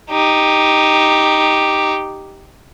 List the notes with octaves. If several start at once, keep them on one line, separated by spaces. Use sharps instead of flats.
D#4 G4